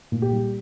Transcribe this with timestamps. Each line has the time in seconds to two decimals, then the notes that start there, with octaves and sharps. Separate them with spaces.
0.12 A#2
0.22 G4
0.33 G3